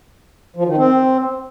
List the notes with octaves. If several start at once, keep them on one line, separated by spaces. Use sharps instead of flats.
F3
D#3
C4